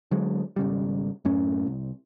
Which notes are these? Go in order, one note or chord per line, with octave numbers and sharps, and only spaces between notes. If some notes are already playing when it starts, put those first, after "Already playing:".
D3 F#3 G#3
G#1 C#3 G3
F#2 A2 C#4
C2